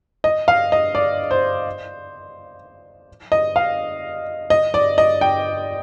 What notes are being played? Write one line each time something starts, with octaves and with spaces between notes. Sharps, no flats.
D#5
F5
D#5
D5
C5
D#5
F5
D#5
D5
D#5
G5